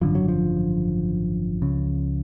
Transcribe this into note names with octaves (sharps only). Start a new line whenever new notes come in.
G#1 F#2 D3 F3
F#3
F3
C#2 C#3